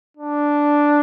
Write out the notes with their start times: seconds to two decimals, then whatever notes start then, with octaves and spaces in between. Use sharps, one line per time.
0.17 D4